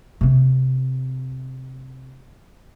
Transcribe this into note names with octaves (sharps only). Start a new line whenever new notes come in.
C3 C4